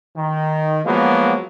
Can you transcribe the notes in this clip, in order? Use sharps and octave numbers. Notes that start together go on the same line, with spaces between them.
D#3
F3 F#3 G#3 A#3 B3